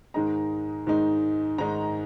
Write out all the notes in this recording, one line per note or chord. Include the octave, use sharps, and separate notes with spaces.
G#2 D#3 G#3 D#4 A#5
G#2 D#3 G#3 D#4
G#2 D#3 G#3 D#4 A#5